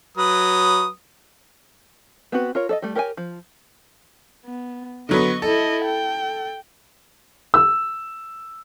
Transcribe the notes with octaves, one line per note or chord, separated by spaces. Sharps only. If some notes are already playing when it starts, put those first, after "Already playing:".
F#3 B4 D#6
B3 C4 F#4 B4
F4 A#4 C#5
A4 D5 D#5
G3 A3
G4 A#4 C#5 D5 G#5
F3
B3
D3 F#3 B3 D#5 C#6
E4 A4 D#5
G5
E6